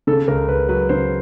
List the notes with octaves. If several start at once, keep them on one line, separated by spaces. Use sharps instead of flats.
C#3 A4
C#2 A#4
C#2 B4
F#3 B4
C#3 C5